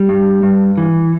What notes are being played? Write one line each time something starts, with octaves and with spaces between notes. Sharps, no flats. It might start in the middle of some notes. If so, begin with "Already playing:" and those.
Already playing: G3
G2
G2
E3